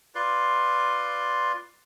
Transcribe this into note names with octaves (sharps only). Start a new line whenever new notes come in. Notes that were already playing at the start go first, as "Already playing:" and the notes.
F4 B4 D5 C6